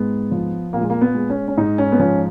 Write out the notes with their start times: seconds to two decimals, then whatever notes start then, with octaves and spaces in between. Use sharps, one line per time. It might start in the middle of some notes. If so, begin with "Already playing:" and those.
Already playing: G#2 G#3 B3
0.31 F3
0.73 A#2 A#3
0.81 G#3
0.90 A#3
1.01 B3
1.15 G#3
1.30 C#4
1.48 C#4
1.57 G#2 D#4
1.78 C#4
1.92 B3
1.99 F3 C#4